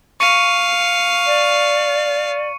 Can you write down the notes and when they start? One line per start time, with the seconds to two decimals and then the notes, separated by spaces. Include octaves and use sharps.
0.20 F5 C#6 C#7 D#7
1.25 D5